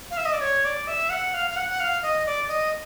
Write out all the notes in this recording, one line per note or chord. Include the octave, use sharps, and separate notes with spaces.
F5
E5
D#5
D5
C#5
D5
E5
F#5
F5
F5
F#5
F#5
F5
D#5
D5
D#5